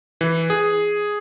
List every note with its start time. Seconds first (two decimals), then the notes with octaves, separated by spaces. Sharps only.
0.21 E3
0.50 G#4